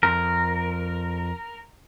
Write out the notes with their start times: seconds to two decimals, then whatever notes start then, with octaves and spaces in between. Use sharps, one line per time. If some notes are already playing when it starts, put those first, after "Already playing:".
0.03 F2 A#4